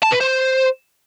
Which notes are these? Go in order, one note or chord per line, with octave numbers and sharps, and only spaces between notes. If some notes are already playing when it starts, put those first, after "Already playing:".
A5
B4
C5